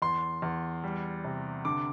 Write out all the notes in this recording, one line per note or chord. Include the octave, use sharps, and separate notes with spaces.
E2 C6
E2
G3
C3
D3 D6